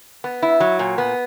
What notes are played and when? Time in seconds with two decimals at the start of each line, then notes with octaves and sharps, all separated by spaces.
0.24 B3
0.42 E4
0.60 F#3
0.79 A#2
0.98 B3